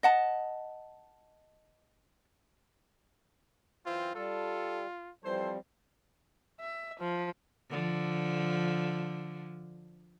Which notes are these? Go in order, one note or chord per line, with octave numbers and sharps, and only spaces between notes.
D#5 F#5 A5
F#2 E3 C4 F4
G3 F4 A4
E3 F3 G3 C4 A4 C5
E5
F3
D3 F3